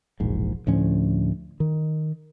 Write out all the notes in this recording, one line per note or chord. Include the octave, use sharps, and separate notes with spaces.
E1 A#1 G#2
D2 A2 F3 C#4
D#3